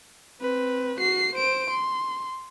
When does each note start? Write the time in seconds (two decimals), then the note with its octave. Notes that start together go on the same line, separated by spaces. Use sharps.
0.40 C4 B4
1.00 F#4 C7
1.35 C5 D7
1.70 C6